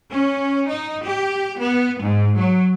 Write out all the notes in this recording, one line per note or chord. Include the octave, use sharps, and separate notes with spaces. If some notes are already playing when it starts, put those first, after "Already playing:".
C#4
D#4
G4
B3
G#2
F#3